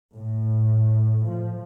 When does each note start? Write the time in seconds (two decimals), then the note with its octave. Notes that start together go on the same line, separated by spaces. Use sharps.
0.15 A2
1.27 F3